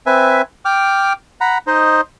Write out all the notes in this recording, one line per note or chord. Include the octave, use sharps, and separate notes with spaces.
C4 B4 E5 G#5
G5 D6 F6
F#5 A#5 B5
D#4 C5 D#5